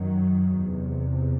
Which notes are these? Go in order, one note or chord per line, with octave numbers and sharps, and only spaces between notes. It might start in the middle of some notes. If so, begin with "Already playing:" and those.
Already playing: F#2 D#3 F#3
E2 C3